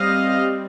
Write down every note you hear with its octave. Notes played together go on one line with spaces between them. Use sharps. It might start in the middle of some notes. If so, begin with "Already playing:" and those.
Already playing: G3 C4 D#5 F5